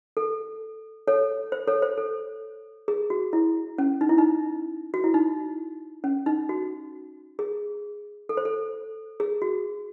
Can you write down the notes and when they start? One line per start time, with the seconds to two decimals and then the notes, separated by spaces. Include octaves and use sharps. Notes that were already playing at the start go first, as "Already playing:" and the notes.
0.17 A4
1.08 A4 C#5
1.52 C5
1.67 A4 C#5
1.82 C5
1.97 A4
2.88 G#4
3.10 F#4
3.33 E4
3.78 C#4
4.01 D#4
4.09 E4
4.18 D#4
4.94 F#4
5.04 E4
5.14 D#4
6.04 C#4
6.26 D#4
6.49 F#4
7.39 G#4
8.29 A4
8.37 C5
8.45 A4
9.20 G#4
9.42 F#4